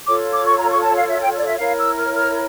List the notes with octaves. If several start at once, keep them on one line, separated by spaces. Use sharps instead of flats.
F4 A4 C#5 D6
D6
C#6
A#5
C#6
A5
F5
E5
G5
D5
E5
E4 A#4 C#5 F5
E6
F6
F6